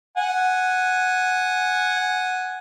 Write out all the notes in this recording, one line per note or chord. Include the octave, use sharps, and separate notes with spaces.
F#5 G#5